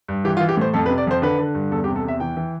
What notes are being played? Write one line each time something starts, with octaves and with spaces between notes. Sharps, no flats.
G2
E3 G4
F4
E3
G4
A2 C5
F2 A4
B4
C3
D5
F2 C5
D3 B4
D3
G2
E2 A4
G4
C3
A4
E2 E5
E3 G5
E3